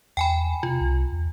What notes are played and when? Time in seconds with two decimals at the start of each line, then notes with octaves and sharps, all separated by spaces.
0.17 E2 G5 G#5 B5
0.63 C3 F4
0.81 C2
1.13 E2